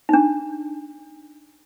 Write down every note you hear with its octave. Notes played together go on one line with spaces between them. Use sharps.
D4 D#4